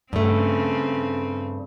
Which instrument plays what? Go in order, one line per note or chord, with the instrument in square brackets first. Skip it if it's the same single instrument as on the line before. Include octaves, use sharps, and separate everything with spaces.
[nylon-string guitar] G2 A3 [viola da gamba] C#3 C4